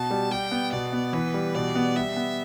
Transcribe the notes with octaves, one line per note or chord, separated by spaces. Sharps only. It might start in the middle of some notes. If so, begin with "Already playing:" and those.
Already playing: B2 A5
G3
G3 G5
B3
B2 D5
B3
E3 B4
G3
B2 D5
B3
G3 E5
B3